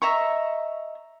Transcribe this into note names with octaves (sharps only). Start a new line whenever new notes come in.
D#5 E5 A#5 C#6